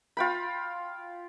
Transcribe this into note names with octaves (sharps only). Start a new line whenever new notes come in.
F4 G5 B5